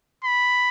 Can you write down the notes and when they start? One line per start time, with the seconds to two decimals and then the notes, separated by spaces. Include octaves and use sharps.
0.25 B5